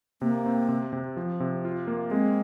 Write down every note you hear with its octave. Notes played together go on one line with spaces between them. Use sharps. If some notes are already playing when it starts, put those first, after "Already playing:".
C3 A#3
C4
C3
C3
F3
C3
F4
A#3
G#3 C4